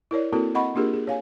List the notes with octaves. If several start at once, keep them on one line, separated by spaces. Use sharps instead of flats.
E4 A#4 C#5 D5
A#3 C4 E4 F#4 A4 A#4
C4 D#5 F#5 B5 C#6
A#3 D4 F4 G4 G#4 A#4
G#4
C#5 F5 G#5